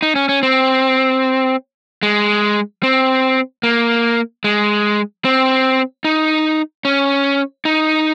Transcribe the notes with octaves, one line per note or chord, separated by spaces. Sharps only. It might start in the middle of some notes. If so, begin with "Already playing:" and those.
D#4
C#4
C#4
C4
G#3
C4
A#3
G#3
C4
D#4
C#4
D#4